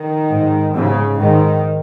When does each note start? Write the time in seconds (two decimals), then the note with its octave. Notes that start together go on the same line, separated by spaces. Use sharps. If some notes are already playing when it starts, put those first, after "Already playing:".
Already playing: D#3
0.29 G#2
0.73 G#2 C#3
1.18 G#2 D#3